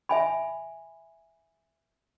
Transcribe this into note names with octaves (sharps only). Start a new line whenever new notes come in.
E5 G#5 B5